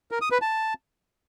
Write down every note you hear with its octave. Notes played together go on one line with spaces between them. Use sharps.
A#4
D#6
B4
A5